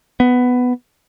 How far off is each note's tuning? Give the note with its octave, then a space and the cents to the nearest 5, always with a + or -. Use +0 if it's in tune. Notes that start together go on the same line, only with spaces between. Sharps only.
B3 +10